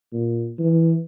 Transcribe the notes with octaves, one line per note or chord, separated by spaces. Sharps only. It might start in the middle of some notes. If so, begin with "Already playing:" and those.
A#2
E3